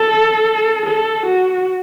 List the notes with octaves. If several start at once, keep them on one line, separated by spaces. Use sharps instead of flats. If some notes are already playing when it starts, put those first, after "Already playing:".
Already playing: A4
A4
F#4